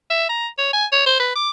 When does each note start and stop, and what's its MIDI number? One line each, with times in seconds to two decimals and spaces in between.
0.10 0.25 76
0.30 0.47 82
0.58 0.72 73
0.73 0.86 80
0.92 1.05 73
1.06 1.19 72
1.20 1.31 71
1.36 1.50 86